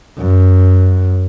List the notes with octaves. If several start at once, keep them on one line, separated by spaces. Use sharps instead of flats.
F#2